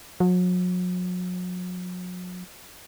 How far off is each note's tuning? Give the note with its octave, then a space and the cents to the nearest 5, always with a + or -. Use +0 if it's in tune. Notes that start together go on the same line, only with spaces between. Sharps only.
F#3 -40